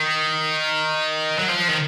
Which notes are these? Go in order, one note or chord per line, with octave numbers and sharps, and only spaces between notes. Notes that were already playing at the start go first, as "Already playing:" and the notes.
Already playing: D#3
F#3
F3
D#3